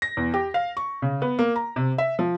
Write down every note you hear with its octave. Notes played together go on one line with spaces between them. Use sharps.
A#6
E2
G4
F5
C#6
C#3
B3
A#3
A#5
C3
E5
F3